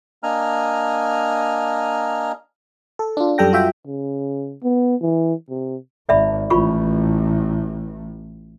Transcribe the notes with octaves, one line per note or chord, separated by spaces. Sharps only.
A#3 D4 D#5 G#5 A#5 F6
A4
D4 F4
F#2 G3 A4 G5 A#6
F4 F#4 E5 G5
C#3
B3
E3
C3
G#1 D5 E5 B5
A1 A2 F4 B5 C#6